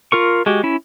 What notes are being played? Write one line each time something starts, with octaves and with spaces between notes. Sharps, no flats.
F4 A#4 C#6
G#3 F#4 G4
C#4 E4